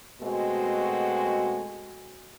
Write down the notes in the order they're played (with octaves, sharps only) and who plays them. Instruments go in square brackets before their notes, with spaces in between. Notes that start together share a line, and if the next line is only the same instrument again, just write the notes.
[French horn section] B2 G#3 A3 C4 F#4